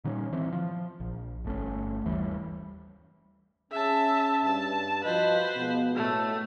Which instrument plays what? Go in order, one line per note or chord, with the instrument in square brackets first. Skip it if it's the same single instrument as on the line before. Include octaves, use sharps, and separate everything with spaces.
[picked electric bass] A#2 D#3 G3 C#4
E3 C4
F3
A#1
G1 A3 C#4
D#2 E3 G3
[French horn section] C#4 [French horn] G#4 [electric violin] E5 A5
[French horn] G2 [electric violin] A5
[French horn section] F3 F#4 [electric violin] B4 C5 [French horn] D#5
[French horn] B2 [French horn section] F3 G#3 B3
[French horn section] A2 [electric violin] A3